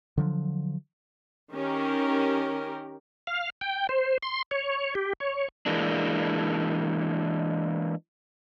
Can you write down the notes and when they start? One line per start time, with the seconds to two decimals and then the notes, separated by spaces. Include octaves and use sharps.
0.17 D3 F3 F#3
1.52 D#3 C#4 G4 A#4
3.27 F5
3.61 G5
3.89 C5
4.23 C6
4.51 C#5
4.95 G4
5.20 C#5
5.66 E3 G#3 A#3 D4